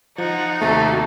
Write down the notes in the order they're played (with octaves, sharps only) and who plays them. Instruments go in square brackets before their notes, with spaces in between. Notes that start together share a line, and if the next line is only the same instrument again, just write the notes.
[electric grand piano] F3 [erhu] D#4 [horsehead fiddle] F#5
[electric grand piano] D#2 C3 [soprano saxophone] A3 [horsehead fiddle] F#4 A4